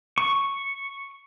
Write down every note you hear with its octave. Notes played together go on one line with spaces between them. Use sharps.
C#6